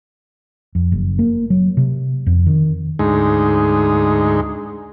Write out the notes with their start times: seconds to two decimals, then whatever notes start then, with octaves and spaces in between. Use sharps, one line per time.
0.75 F2
0.92 F#1
1.19 A#3
1.50 F#3
1.77 C3
2.26 F2
2.47 D#3
2.99 D2 G#2 G#3 D#4